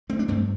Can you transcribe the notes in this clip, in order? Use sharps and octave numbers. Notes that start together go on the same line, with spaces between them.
A3 C4
D4
G2 A3 C4